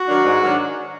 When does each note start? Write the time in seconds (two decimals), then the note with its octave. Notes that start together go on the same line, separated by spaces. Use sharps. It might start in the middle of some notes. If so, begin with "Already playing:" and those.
Already playing: F#4
0.08 D#3 F#3 D4
0.25 G#2
0.42 D#3 F#3 D4